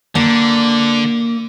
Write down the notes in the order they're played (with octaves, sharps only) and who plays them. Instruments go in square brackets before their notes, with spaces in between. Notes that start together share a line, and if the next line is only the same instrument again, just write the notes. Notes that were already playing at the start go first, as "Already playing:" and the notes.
[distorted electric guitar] D3 [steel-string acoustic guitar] A#3